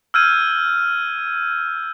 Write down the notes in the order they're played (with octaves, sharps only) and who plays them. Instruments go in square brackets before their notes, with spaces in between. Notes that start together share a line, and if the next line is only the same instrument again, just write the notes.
[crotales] E6 F6 G6 G#6 D#7